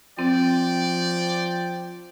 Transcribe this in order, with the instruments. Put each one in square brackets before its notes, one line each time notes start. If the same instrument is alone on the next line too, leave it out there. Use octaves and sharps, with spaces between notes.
[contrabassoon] F3 [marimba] C4 [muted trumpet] D5 [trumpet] G5